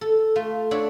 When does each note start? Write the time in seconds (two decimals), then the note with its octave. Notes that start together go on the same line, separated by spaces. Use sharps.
0.01 A4
0.36 A3 F4
0.71 D4 C#5 E5 F#5